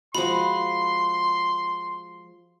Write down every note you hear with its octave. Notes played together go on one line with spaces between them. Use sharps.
F3 G#3 F#4 B5 C6